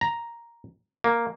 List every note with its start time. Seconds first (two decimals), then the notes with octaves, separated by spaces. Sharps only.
0.01 A#5
1.04 A#3